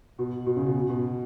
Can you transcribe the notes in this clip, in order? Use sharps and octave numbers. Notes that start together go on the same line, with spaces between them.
B2
B2
C#3
B2
B2